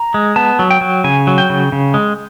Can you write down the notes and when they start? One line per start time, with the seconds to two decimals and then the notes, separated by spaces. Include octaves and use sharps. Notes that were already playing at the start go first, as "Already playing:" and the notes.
Already playing: A#5
0.14 G#3
0.36 B3 A5
0.59 F#3
0.71 G5
0.81 F#3
1.04 C#3 G#5
1.27 F#3
1.38 G5
1.50 C#3
1.72 C#3
1.94 G#3